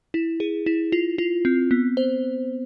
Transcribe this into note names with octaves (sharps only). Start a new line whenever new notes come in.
E4
G#4
E4
F4
F4
C4
B3
C5